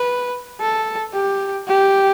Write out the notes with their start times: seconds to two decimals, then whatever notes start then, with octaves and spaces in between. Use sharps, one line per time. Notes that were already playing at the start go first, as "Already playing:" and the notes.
Already playing: B4
0.61 A4
1.14 G4
1.68 G4